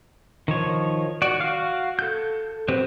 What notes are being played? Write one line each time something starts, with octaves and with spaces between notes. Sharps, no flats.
D#3 F3 C#5
F#4 D5
F#4 F5
A4 G6
F#3 C4 G4 B4 C5